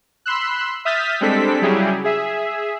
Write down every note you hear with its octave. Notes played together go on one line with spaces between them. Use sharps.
B5 C6 E6 F#6
E5 D#6 F6 G6 A6 B6
G3 G#3 C4 D4 A4 B6
C#3 F#3 G3 E4 G4 G#4
G#4 E5